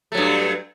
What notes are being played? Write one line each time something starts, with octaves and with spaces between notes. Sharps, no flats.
G2 F#3 A3